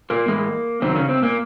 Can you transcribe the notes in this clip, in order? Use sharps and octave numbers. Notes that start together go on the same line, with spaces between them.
A#2 A#3
A2 E3 G#3
F#2 C3 D#3 F#3 C4
C#3 C#4
C3 C4
A#2 A#3